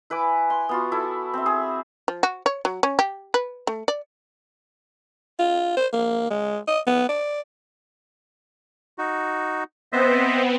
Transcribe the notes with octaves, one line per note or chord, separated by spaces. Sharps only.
E4 B4 G#5 D6
C6
B3 F4 F#4
E4 A4
C4 E5
G#4
F3
F#4
C#5
F#3
C#4
G4
B4
A3
D5
F4
C5
A#3
G#3
D#5
B3
D5
D#4 F#4
B3 C4 C5 D#5 E5